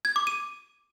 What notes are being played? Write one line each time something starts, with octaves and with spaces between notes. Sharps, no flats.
G#6
D6
D#7